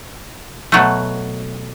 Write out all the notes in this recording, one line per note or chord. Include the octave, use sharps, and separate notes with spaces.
B2 F#3 A3